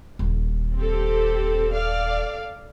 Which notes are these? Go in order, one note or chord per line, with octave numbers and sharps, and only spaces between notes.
D#1
C4 G4 A4
A4 D5 F5